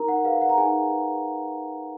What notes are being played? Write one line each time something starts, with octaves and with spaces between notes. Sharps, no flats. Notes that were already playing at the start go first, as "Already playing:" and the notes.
Already playing: D#4 A#4 A#5
F#5
G#4 B4 F5
F#5
A#5
D#4 G#4 G#5
G#4 B4